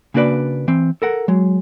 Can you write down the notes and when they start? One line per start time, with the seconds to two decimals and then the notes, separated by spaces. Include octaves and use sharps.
0.14 C#3 A#3 D4 F#4 B4 D5
0.68 E3 C4
1.02 A4 A#4 F#5
1.28 F#3 G#3